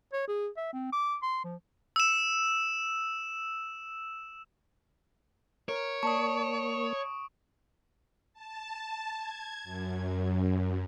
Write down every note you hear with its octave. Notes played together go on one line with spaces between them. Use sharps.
C#5
G#4
E5
C4
D6
C6
F3
E6 E7
A#4 C#5 D7
A#3 D5 A5 C#6 D#6
A5
G#6
F#2